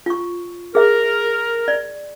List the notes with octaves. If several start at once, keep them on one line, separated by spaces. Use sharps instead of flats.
F4 C#6
G#4 A#4 E5
D5